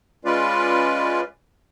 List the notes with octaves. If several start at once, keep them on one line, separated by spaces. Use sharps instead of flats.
G#3 C#4 F4 B4 D5